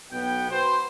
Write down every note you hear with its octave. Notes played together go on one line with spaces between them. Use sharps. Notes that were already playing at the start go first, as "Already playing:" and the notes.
B1 B2 B3 G5
F#4 B4 C5